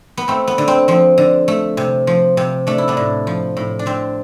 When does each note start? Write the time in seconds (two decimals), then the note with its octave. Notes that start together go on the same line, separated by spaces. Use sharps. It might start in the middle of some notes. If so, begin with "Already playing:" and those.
0.17 B3
0.28 A3 C4
0.47 B3
0.58 D3
0.68 C4
0.88 F3 C4
1.18 D3
1.48 A3
1.77 C3
2.07 F3
2.37 C3
2.67 A3 D4
2.78 E4
2.88 B3 D4
2.97 A2
3.27 F3
3.57 A2
3.79 D4
3.86 D3 C4